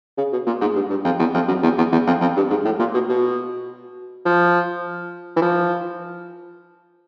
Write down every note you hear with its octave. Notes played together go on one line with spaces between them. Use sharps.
C#3
B2
A#2
G#2
G2
G2
F2
E2
F2
F#2
E2
E2
E2
F2
F2
G2
G#2
A2
A#2
B2
B2
F3
E3
F3